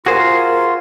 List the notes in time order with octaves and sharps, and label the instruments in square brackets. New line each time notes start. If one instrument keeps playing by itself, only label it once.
[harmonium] F4 [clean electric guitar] F#4 G#4 C5 [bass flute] A#4